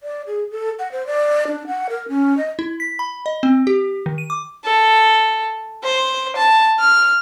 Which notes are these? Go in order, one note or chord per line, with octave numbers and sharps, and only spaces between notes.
D5
G#4
A4
F#5
C5
D5
D4
F#5
A#4
C#4
D#5
E4
B6
B5
D#5
C4
G4
D#3
D#7
D6
A4
C5
A5
F6